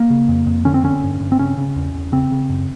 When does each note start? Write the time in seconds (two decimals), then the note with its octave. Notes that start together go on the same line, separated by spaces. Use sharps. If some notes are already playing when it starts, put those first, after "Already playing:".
Already playing: A#3
0.10 C#3
0.29 F2
0.47 F2
0.65 D3 C#4
0.74 C4
0.84 D3 C#4
1.03 G2
1.20 G2
1.32 C4
1.39 C#3 C#4
1.57 C#3
1.76 E2
1.94 E2
2.12 C#3 C4
2.32 C#3
2.50 F#2